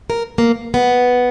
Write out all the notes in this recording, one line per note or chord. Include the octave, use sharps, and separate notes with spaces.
A#4
A#3
B3